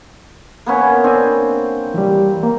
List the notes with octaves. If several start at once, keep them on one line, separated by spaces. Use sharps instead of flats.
A#3 B3 C#4
C4 D4 G#5
E3 G3
A#3